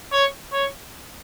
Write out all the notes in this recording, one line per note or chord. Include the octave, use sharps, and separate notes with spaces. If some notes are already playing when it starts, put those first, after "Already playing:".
C#5
C#5